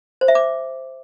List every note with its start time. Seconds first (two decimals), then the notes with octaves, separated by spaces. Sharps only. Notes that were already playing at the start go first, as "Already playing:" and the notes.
0.21 C5
0.28 E5
0.35 D6